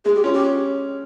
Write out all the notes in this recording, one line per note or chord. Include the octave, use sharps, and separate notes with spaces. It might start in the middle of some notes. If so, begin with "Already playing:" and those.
G#3 G#4
G4
C#4 F4
G4